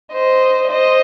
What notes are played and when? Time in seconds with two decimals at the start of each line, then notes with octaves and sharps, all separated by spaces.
0.13 C5 D#5
0.70 C5 D#5